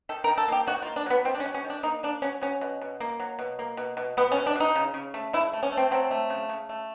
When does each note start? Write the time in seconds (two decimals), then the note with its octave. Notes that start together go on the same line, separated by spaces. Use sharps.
0.09 D#3 A4
0.24 A#4
0.28 D#3
0.38 A4
0.48 A#3 G4
0.67 D#3 F#4
0.82 F4
0.86 A#3
0.96 D4
1.06 F#3 B3
1.25 D#3 C4
1.35 D4
1.40 C#4
1.46 F#3
1.54 C#4
1.64 D#3
1.70 D4
1.83 A#3 D#4
2.03 A#3 D4
2.22 F#3 C#4
2.41 F#3 C#4
2.61 B2
2.81 B2
3.00 A#3
3.20 F#3
3.39 B2
3.59 A#3
3.77 B2
3.97 B2
4.17 B2 B3
4.32 C#4
4.37 B2
4.46 D4
4.56 B2 D#4
4.76 C#3
4.94 C#3
5.14 A3
5.33 C#3 E4
5.53 A3
5.63 C#4
5.72 A3
5.77 C4
5.91 F#3 C4
6.11 A3
6.30 C#3
6.49 C#3
6.69 A3